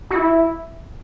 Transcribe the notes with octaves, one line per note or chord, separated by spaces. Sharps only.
F#4
E4